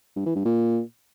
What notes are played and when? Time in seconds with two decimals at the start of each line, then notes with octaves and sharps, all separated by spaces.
0.16 G2
0.26 E3
0.35 G2
0.45 A#2